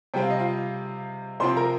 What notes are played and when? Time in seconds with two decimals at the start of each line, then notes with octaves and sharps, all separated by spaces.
0.14 C3 G3 C4 G5
0.22 F5
0.30 D#5
0.39 F4 F5
1.40 C3 F3 C4 C5 C6
1.57 A#4 A#5